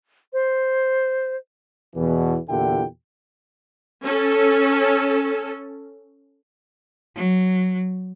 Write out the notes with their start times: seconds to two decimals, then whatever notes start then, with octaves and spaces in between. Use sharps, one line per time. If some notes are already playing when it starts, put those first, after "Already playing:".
0.33 C5
1.95 E2 B2 E3
2.48 E2 A#2 D3 E4 G4 G5
4.04 C#4 A4
7.16 F#3